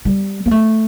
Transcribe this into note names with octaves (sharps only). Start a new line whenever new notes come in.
G3
A#3
A3